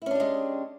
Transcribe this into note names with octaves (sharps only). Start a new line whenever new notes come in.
G#3 C#4 D4 E4 G4